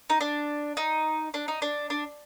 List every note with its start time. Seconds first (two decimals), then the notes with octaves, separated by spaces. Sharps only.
0.10 D#4
0.21 D4
0.77 D#4
1.34 D4
1.48 D#4
1.62 D4
1.90 D4